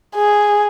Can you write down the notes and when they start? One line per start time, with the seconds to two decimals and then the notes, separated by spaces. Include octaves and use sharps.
0.15 G#4